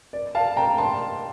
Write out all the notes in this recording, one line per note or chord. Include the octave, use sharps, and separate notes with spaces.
D5
F5 A5
G5 A#5
A5 C6